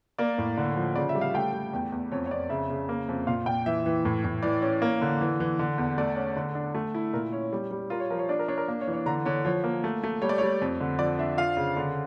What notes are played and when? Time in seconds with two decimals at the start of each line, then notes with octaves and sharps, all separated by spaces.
0.19 A#3 D5
0.38 A2
0.57 D3
0.76 F3
0.96 C#3 D5
1.09 E5
1.15 G3
1.21 F5
1.34 A3 G5
1.53 A3
1.73 E2
1.92 E2
2.12 F2 C#5
2.26 C#5
2.30 F2 D5
2.50 C#3 E5
2.70 C#3
2.89 A#3
3.09 F2
3.27 A#2 F5
3.46 A#2 G5
3.66 E3 E5
3.86 E3
4.05 A2
4.24 A2
4.43 E3 D5
4.62 C#4
4.82 A#3
5.02 D3
5.21 E3
5.40 E3
5.59 D3
5.78 E2
5.98 A3 D5
6.16 C#4
6.36 D3
6.55 D4
6.75 A3
6.94 E4
7.13 A#2 A#4
7.33 C#4 C#5
7.53 G3
7.71 G3
7.90 F4 A#4
8.00 C#5
8.10 F3 A#4
8.19 C#5
8.29 D4 D5
8.39 A#4
8.48 D4 C#5
8.58 A#4
8.68 A#3
8.81 C#5
8.87 E3
8.93 C#5
9.06 D3 A#5
9.25 D3 C#5
9.45 F3 C#5
9.64 A#3
9.84 A3
10.03 A3
10.22 G3 C#5
10.29 D5
10.38 G3 C#5
10.61 F2
10.80 D3
10.99 F3 D5
11.19 D4 E5
11.37 F4 F5
11.57 C#3
11.76 D3